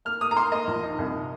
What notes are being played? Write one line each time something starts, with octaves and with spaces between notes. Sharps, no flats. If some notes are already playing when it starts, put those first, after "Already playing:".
A#3 F6
A#3 D#6
A#5
A#3 C6
A#3 D#5
A#1
D#4
C2